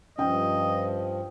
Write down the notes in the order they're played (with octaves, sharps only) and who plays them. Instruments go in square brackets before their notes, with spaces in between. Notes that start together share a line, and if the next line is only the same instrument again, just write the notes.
[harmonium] G2 F3 [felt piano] C#4 G5 [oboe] D#5